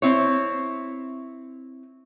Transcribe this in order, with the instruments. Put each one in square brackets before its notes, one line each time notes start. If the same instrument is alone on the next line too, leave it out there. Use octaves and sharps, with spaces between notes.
[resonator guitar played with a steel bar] C4 E4 C#5